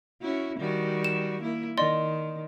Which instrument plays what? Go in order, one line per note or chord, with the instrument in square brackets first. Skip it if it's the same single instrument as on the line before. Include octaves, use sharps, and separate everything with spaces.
[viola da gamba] C#4 E4 F#4
D#3 G3 F#4
[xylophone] E7
[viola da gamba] A#3 E4
[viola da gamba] D#3 [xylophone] D5 D#5 C6